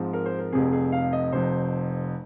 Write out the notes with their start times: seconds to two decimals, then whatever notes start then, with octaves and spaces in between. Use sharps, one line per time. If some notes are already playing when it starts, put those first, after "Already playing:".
Already playing: G#2 F3 C4
0.13 A#4
0.26 C5
0.39 A#4
0.52 F1 F2 C3 G#4
0.73 G#4
0.92 F5
1.13 D#5
1.32 F1 F2 C3 C5